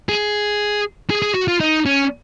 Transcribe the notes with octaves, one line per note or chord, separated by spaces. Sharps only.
G#4
G#4
G#4
F#4
F4
D#4
C#4